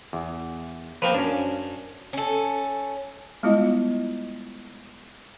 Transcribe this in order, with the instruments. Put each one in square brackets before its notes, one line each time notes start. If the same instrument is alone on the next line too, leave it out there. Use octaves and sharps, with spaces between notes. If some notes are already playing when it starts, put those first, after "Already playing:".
[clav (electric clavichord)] E2
[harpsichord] F3 A#3 [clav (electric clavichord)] C4 A#4 B4
[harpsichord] F#2 [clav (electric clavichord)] C#4 D4
[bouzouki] C#4 A4
[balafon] G3 G#3 B3 E4 F4 D#5